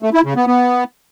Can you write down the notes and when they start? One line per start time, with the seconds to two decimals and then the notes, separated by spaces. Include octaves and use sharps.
0.03 A3
0.14 E4
0.25 C#3
0.36 B3
0.47 B3